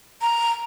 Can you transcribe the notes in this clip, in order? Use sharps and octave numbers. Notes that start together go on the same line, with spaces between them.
A#5